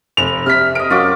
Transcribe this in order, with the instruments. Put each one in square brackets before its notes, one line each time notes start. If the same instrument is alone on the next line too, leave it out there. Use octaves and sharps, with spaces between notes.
[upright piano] F1 F7
[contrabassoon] C3 [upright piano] F6 B6
[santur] A#4 D#5 [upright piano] D7
[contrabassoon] F#2 [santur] F4 F#4 D6